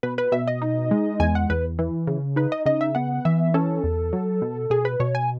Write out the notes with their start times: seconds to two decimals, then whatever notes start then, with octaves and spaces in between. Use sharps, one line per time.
0.03 B2 B4
0.18 B4
0.32 B2 E5
0.47 D#5
0.62 D#4
0.91 G#3
1.20 E2 G#5
1.35 F#5
1.50 E2 B4
1.79 E3
2.07 C#3
2.36 D#4 B4
2.52 D#5
2.66 C#3 D#5
2.81 E5
2.95 B3 F#5
3.25 E3 E5
3.54 C#4 A4
3.84 E2
4.13 F#3
4.42 B2
4.70 B2 G#4
4.85 B4
5.00 B2 C#5
5.15 G#5